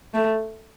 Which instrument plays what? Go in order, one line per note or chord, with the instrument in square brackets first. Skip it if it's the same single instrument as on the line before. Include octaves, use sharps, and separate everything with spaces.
[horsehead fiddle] A3